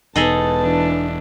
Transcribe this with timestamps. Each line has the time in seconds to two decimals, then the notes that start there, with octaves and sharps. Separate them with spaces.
0.16 E1 B3 D#4 G#4 A4 A5
0.61 E3 D4